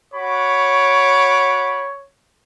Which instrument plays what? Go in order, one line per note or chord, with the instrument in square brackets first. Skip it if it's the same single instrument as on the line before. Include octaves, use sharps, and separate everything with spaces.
[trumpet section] F#4 B5 D6 [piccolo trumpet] C#5